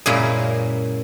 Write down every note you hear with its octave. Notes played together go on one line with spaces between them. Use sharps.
F#2 A#2 C#3 G#3 A#3 E4